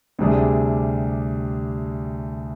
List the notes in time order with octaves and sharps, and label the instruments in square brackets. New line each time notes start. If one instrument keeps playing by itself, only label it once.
[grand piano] D2 C3 G3 D4 G#4